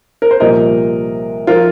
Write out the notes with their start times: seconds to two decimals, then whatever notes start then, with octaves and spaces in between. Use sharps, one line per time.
0.22 A#4
0.31 C5
0.40 C2 A#2 F3 A#4 D#5
1.47 F3 F4 A#4